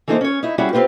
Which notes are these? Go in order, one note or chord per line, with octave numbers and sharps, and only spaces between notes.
E3 A3 A#3 D#4 A#4 C5
C#4 C#5
D#4 E4
G3 C#4 E4 F#4 G#4
C4 C#4 F4 G4 B4